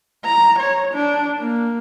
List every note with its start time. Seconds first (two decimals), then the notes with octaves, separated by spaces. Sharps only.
0.25 A#5
0.59 C#5
0.93 D4
1.39 A#3